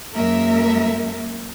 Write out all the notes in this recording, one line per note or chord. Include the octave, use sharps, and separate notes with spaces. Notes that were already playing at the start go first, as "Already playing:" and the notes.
F#2 G#3 A#3 A#4 E5